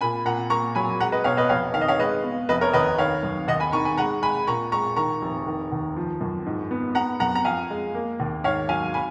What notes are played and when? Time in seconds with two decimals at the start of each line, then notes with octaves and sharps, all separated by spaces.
0.01 A#2 G#5 B5
0.25 A#2 F#5 A#5
0.50 A#3 A#5 C#6
0.75 F#3 G#5 B5
1.00 G#3 F#5 A#5
1.12 B4 D#5
1.24 B2 C#5 F5
1.37 B4 D#5
1.49 F1 C#5 F5
1.74 D#3 F5
1.81 D#5
1.88 C#5 F5
1.99 G#3 B4 D#5
2.24 B3
2.49 F1 B4 D#5
2.61 A#4 C#5
2.73 D#2 B4 D#5
2.98 D#3 C#5 F5
3.23 F#2
3.48 D#2 D#5 F#5
3.60 G#5 B5
3.72 D#3 A#5 C#6
3.85 G#5 B5
3.97 G#3 F#5 A#5
4.22 G#3 G#5 B5
4.47 A#2 A#5 C#6
4.72 G#3 A#5 C#6
4.96 D#3 A#5 C#6
5.22 F1
5.47 D#3
5.72 D#2
5.96 F3
6.21 F#2
6.46 G#2
6.71 B3
6.95 B3 F#5 A#5
7.20 F#2 F#5 A#5
7.35 A#5
7.44 F2 F5 G#5
7.70 G#3
7.95 A#3
8.20 D#2
8.44 G#2 C#5 F5
8.69 F#3 F5 G#5
8.94 G#5 B5